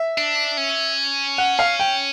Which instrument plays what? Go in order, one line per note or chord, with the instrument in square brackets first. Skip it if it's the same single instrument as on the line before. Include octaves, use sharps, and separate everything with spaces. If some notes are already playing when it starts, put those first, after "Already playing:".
Already playing: [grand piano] E5
[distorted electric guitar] D4
C#4
[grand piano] F#5
F5
G5